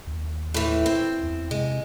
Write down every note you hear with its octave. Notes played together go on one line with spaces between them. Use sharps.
D#2
A2 E3
C4
E2
C3 G#3